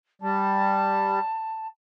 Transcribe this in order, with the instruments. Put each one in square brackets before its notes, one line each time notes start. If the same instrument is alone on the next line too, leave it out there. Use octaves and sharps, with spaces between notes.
[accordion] G3 [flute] A5